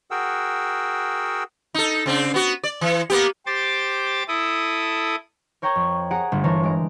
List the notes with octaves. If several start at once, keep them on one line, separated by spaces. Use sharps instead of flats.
F#4 G#4 A#4 F#5 G5 E6
D#4 A4
C#3 C4 D4
B3 F#4
D5
E3
A#3 B3 G4
G4 C5 D6 A6
E4 A4 D#6
A#4 C#5 G5 A#5 C#6 G#6
F2
G#4 F#5 A#5 F#6 D7
G1 A3
E3 D4 A#4 C5 C#5
G#3 A#4 D7